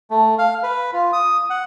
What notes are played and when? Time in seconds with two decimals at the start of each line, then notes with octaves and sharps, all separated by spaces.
0.11 A3
0.38 F5
0.63 B4
0.93 F4
1.13 D#6
1.50 F#5